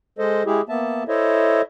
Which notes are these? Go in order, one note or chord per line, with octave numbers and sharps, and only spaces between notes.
G#3 A4 C5 D#5
G#3 E4 G4 G#4
A#3 B3 E5 A5
E4 A4 C5 C#5 D#5 E5